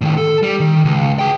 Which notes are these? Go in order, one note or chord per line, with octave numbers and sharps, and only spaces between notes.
A2 D#3
A4
G3
D#3
C#2
G#4 G5